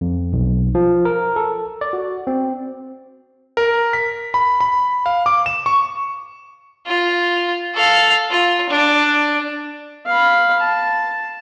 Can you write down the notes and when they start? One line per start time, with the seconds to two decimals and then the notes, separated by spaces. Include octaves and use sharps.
0.01 F2
0.33 B1
0.75 F3
1.05 A#4
1.36 A4
1.81 D5
1.93 F#4
2.27 C4
3.57 A#4
3.93 B6
4.34 B5
4.61 B5
5.06 F5
5.26 D6
5.46 E7
5.66 C#6
6.87 F4
7.74 A4 F5
8.31 F4
8.69 D4
10.07 F5 B5
10.60 A5